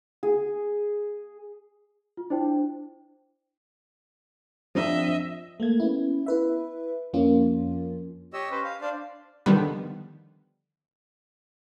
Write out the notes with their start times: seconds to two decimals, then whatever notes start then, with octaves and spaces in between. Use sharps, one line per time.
0.23 G#4
2.17 F4
2.30 D4 E4 C5 G5
4.75 F3 C4 D4 D#5 E5
5.60 A3 A#3 G#6
5.80 B3 C#4 E4
6.26 E4 B4 E5
7.13 F2 F3 A#3 C#4 F4
8.33 G4 C#5 D#5 E6
8.51 C#4 B4 C5
8.64 F5
8.81 D4 C5 D5 F5
9.46 D3 D#3 F3 G3 B3